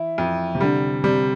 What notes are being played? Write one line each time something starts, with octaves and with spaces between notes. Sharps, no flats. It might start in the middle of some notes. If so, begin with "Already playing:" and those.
Already playing: E3 E4
F2
C3
D3 G3
C3 G3